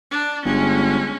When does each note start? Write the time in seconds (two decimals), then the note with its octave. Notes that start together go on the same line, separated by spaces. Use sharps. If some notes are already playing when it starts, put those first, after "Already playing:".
0.11 D4
0.45 G1 G#3 C#4